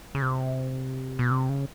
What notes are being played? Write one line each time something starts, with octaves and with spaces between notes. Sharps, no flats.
C#3
C3
B2
C3
C#3